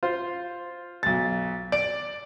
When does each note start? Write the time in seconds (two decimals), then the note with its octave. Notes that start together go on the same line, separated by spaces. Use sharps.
0.03 F4 C5
1.03 B1 A6
1.72 D5 D7